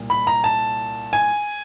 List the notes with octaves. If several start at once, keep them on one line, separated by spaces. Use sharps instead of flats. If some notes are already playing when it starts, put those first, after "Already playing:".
Already playing: C2 A#2
B5
A#5
A5
G#5